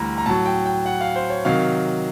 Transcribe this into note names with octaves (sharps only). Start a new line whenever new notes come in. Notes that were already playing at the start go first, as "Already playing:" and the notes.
Already playing: D2 E3 G3 A#5
A#5
A2 F#3 A5
G5
G5
F#5
F5
C5
C#5
C3 D#3 F#3 F5